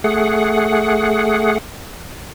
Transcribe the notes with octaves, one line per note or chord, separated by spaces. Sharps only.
A3 G#4 F#5